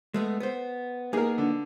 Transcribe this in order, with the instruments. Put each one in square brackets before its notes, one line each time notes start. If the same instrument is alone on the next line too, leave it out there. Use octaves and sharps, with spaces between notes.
[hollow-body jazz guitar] G#3 A3 B3
B3 C5
[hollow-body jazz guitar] A#3 B3 D#4 [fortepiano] G#4 A#4
[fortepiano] D3